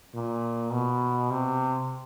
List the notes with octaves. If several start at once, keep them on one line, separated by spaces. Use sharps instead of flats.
A#2
B2
C3